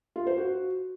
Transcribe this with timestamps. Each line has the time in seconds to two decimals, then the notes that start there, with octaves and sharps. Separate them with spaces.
0.16 F4
0.27 C5
0.38 F#4